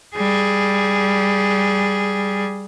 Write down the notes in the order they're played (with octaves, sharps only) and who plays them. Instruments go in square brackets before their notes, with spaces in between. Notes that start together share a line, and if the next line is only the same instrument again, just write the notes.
[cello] G3 G#4